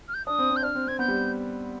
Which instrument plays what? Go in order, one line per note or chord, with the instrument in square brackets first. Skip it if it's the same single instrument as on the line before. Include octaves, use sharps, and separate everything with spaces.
[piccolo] F6
G6
[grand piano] D4 [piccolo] D#6
[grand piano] C4
C4
[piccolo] G6
[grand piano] D4 [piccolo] F6
[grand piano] C4
[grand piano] C4 [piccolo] G#6
[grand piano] B3 [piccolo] G6
[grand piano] G3